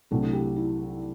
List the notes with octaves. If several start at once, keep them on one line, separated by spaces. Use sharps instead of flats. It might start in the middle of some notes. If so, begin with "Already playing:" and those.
C2 C3 F#3 A3 D4 E4
E4 G4
E4